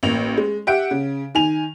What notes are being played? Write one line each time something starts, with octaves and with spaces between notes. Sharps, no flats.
A1 A#3 F7
G#3
G4 E5 F#5 D7
C#3
D#3 G#5 F7